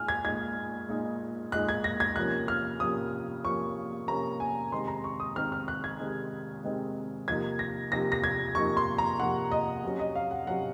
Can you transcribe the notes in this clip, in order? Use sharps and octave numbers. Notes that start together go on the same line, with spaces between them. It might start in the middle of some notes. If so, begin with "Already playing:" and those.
Already playing: A#2 G#3 D#4 G#5 F6
G#6
A#2 G#3 D#4 G#6
A#2 G#3 D#4
A#2 G#3 D#4 F#6
G#6
A#6
G#6
C3 F3 A#3 C#4 F#6
F6
C3 F3 A#3 C#4 D#6
C3 F3 A#3 C#4 C#6
C3 F3 A#3 C#4 A#5
G#5
C3 D#3 G#3 C4 D#4 C6
A#5
C#6
D#6
C3 D#3 G#3 C4 D#4 F6
F6
F#6
G#6
C3 D#3 G#3 C4 D#4
C3 D#3 G#3 C4 D#4
C3 F3 A#3 D#4 G#6
A#6
C3 F3 A#3 D#4 A#6
A#6
G#6
C3 F3 A#3 D#4 C#6
C6
A#5
C3 F3 A#3 D#4 F#5
D#5
C3 F#3 C#4
D#5
F5
F#5
C3 F#3 C#4 F#5